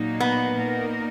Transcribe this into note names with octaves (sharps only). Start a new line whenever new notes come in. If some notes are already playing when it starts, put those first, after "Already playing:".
Already playing: A#2 F#3 A#3 D#4
B3
A#2 A#3 D#4 A#4